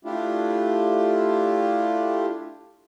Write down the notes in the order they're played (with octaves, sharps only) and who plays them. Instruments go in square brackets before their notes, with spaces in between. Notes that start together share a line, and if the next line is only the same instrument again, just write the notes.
[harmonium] A3 D4 E4 F4 G4